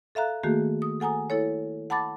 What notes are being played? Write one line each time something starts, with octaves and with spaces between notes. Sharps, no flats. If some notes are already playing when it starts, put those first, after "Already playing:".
A4 E5 F5 A#5 F#6
D#3 A3 A#3 F#4 G#4
D#6
A4 F#5 G#5 A#5 D#6
E4 A4 C#5
F#5 A5 B5 D6 A6